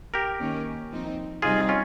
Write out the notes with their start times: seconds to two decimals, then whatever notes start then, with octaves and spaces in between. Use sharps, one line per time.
0.14 G4 A#4
0.40 D#3 A#3 C#4
0.92 F3 C4 D#4
1.42 C3 G3 C4 D#4 F4 G#4
1.69 C#4 F4